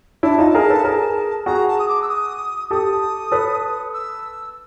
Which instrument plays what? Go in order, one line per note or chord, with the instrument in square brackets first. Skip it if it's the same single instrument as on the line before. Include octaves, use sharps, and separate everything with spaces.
[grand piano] D4 E4 [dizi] A5
[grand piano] D#4 F4
G#4 A#4
A4 B4
G#4 A#4
[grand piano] F#4 G#4 [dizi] A#5
[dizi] A5
D#6
D6
E6
D#6
[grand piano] G4 A4 [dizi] D#6
[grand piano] A4 B4
[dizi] E6